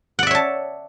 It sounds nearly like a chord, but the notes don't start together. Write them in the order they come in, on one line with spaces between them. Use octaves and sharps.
F#5 D5 E5 C#5 A5